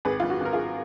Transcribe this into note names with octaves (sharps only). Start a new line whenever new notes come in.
G#1 G#4 B4
G#1 F4
F#4
G#1 A#4
F4 G#4